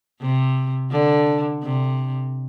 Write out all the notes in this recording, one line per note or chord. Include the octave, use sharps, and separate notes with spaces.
C3
D3
C3